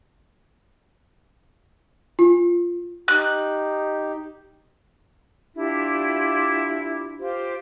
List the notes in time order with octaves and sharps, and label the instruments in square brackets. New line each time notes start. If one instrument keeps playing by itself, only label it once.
[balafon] F4
[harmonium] D#4 G4 [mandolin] F#6
[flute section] D4 E4 F4 G4
F4 G4 C5